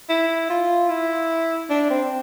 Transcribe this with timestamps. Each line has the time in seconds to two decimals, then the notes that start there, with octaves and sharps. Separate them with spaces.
0.09 E4
0.50 F4
0.90 E4
1.70 D4
1.90 C4